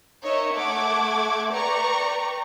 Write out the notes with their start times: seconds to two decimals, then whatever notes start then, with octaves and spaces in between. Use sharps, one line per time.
0.23 D#4 A#4 C#5 D#5 E5
0.54 A3 E5 F#5 D6 G#6
1.52 B4 D5 G5 A#5 C#6